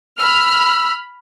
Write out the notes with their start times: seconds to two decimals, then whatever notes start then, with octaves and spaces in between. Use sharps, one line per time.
0.19 B5 E6 F6